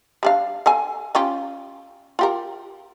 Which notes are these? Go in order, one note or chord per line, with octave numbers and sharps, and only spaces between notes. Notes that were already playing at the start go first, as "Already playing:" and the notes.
G3 D4 F5
A4 F5 G#5
C#4 F4 G4
F4 G4 A#4